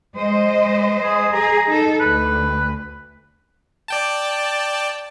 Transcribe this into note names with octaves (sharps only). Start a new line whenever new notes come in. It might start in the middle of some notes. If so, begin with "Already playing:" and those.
G#3 C5 D#5
G#4
G#4 A#5
D#4 A4
D2 B4
D5 G5 A5